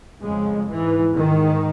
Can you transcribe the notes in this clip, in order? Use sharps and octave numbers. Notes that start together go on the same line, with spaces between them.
F2 C#3 G#3
G#2 E3
G#2 D#3